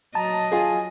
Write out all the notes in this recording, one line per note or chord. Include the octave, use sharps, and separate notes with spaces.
F#3 D#5 A5 A#5
F4 G#4 G#5